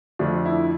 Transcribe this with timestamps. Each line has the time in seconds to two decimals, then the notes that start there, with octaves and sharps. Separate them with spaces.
0.19 F2 D3 F3 A3 D4
0.46 E4